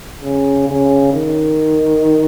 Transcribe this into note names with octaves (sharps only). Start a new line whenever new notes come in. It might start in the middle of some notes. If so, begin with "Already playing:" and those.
C#3
C#3
D#3